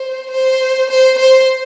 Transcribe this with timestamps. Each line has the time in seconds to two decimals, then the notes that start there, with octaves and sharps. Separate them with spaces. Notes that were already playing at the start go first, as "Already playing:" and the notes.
Already playing: C5
0.31 C5
0.90 C5
1.19 C5